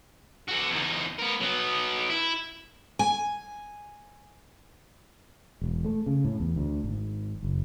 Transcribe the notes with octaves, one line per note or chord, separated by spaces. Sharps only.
F#4 A4
E2 D#4
B3 A#4
F#3 B3
E4
G#5
E1
A3
C#3
A2
E2
D2
G#1
F#1